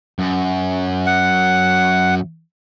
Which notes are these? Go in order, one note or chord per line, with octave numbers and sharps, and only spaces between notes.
F#2
F#5